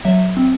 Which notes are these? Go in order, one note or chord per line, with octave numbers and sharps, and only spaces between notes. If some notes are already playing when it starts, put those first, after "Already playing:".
F#3 E5
C4